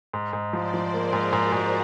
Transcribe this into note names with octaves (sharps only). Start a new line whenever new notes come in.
G#2
G#2
F3 C5 D5
F3
A#3 G#4 A#4
G#2
G#2 F#4 G#4
G#2